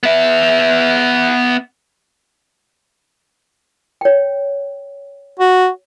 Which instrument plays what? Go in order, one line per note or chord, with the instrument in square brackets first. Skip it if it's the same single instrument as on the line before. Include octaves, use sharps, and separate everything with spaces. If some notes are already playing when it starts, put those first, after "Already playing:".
[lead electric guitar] B3 E5
[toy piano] C#5 G5
[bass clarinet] F#4